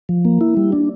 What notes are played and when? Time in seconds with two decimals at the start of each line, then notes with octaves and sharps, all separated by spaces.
0.09 F3
0.25 A#3
0.41 E4
0.57 G3
0.72 D4